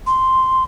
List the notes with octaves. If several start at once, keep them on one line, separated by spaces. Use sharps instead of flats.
C6